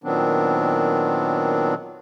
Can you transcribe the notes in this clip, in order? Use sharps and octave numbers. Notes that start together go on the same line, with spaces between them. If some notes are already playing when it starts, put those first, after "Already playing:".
A#2 D#3 F#3 B3 C4 D4